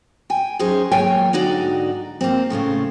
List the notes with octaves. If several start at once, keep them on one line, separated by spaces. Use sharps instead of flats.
G5 G#5
F#2 D#4 G#4 C5 A#5
D#2 A#2 F#3 C#5 G5 G#5
G#2 D3 D#4 F#4 D5 D#5
A#3 C4
A2 C#3 A3 F4